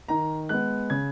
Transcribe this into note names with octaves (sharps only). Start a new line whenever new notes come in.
D#3 A#5
G#3 B3 F#6
C#3 G#6